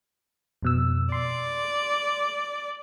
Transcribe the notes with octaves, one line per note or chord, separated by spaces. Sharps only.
F2 B2 E6
D5 C6